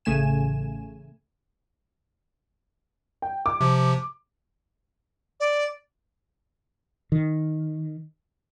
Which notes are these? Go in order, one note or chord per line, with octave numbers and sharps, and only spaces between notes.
A1 C#3 A3 G#5 E7
G5
D6
C3 F3
D5
D#3